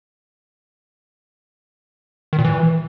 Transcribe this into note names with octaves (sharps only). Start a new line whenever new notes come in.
D#3
A#2
E3